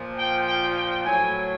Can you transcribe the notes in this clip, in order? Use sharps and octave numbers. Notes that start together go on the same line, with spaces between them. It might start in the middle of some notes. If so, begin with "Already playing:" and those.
Already playing: A#2 F3
G5
G5
G5
A2 F#3 G#5